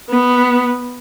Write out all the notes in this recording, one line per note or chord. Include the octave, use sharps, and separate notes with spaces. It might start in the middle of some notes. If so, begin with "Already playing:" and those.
B3